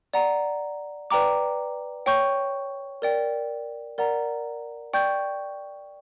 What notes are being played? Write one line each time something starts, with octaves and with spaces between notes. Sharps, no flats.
D5 F#5 A#5
B4 D5 G5 A#5 D6
C#5 G5 C#6 G6
A#4 D5 G5
A#4 D5 F#5 A#5
D5 G5 C#6 G6